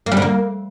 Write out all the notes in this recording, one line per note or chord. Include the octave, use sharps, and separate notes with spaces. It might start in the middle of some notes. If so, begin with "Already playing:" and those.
A#3
G3
D3
A#3